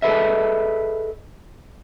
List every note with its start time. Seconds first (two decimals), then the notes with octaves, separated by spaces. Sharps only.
0.02 G#4 A4 B4 D#5 E5